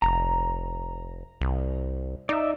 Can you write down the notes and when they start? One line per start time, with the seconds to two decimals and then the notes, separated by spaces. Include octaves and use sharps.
0.02 F1 A#5
1.41 C2
2.29 D#4 D5 E5